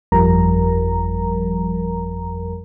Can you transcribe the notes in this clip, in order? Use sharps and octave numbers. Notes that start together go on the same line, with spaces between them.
G1 F2 F3 G3 A#4 A#5